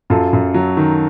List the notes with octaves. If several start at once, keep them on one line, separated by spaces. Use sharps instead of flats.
F#2 F4 A4
F#2
F#3
D#3